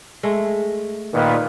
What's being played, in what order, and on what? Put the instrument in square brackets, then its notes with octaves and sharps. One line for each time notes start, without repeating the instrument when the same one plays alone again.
[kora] G#3 A3
[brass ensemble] A#2 D#3 [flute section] A#4 B4